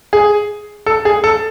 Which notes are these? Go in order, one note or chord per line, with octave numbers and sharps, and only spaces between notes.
G#4
A4
G#4
A4